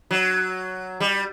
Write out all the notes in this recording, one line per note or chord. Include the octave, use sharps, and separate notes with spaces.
F#3
G3